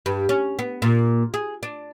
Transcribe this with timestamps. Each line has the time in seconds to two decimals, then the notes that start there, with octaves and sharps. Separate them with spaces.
0.06 G2
0.29 C#4
0.59 B3
0.82 A#2
1.34 G#4
1.63 D4